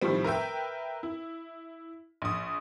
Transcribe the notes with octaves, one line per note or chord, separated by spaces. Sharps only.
A2 D#3 F3 G3 C4
A#4 B4 E5 G5
E4
A#1 D#6